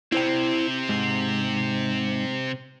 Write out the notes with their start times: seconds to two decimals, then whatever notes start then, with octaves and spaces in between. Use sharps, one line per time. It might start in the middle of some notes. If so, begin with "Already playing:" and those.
0.12 C3 C4 E4 C5 G5
0.89 G#2